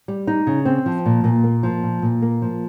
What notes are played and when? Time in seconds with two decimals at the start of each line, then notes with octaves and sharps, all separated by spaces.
0.08 G3
0.27 D#4
0.47 C#3
0.65 C4
0.86 F3
1.06 A#2
1.24 A#2
1.44 A#3
1.63 F3
1.83 A#2
2.02 A#2
2.22 A#3
2.42 F3